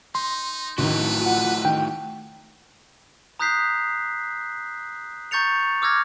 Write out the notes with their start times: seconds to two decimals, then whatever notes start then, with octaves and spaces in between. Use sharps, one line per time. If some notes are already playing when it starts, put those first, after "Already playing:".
0.15 D#4 C6
0.78 A1 D#3 A3 E4 F#4 B4
1.22 F4 F#5
1.65 D#3 G5
3.39 A#5 D#6 F#6 G6 B6 C7
5.31 A#5 C#6 G6 A6 C#7 F7
5.82 D6 E6 F6 G#6 A#6